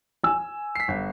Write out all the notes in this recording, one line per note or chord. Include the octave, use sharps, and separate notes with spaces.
G#5 E6
B6 C7
G1